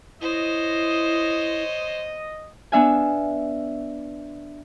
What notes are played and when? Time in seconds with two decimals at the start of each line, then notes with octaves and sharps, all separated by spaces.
0.21 E4 C5 C#5 D#5
2.72 B3 D4 E5 F5 G#5